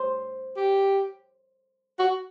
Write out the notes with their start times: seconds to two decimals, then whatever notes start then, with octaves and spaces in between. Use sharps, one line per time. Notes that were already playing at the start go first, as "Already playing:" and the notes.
Already playing: C5
0.56 G4
1.99 F#4